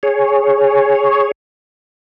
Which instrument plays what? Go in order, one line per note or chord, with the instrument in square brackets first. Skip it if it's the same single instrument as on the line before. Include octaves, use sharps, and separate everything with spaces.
[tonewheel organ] G#4 C#5